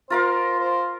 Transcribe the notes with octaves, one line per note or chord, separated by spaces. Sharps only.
F4 A#4 C5 F5
C5